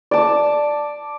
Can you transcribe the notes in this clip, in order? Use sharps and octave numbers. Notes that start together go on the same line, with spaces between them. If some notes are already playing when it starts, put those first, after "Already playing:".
D5 A5